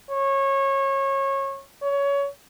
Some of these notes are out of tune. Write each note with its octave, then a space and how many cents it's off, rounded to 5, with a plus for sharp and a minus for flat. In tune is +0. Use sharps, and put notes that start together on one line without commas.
C#5 -25
C#5 +20